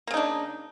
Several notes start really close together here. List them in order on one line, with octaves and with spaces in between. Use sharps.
A#3 C#3 D#4 D4